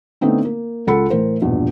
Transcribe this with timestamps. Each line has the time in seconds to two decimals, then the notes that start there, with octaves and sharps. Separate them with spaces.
0.21 D3 A3 B3 C4 D#4
0.45 A#3
0.87 C#2 F4 A4 F#5 B5 C#7
1.10 A2 E3 A#4 C5
1.42 A#1 E2 G2 B2 F3